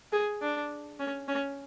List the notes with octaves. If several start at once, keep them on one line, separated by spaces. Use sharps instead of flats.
G#4
D4
C#4
C#4